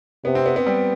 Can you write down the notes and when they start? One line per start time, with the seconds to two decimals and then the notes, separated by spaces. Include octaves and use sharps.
0.25 C3 B3
0.35 C4
0.46 B3
0.56 B3
0.66 G3